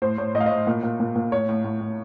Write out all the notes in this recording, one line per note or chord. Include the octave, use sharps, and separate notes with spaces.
A2 C5
A2 C#5
A2 D#5
F5
D#5
A2
A#2
A#2
A#2
A#2
A2 C#5
A2
A2
A2